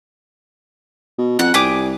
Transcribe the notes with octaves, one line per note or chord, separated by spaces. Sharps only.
B2
F2 F#5 F#6
C2 G4 G#4 D6